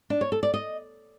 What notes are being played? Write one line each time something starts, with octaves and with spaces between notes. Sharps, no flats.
D4
C#5
A4
D5
D#5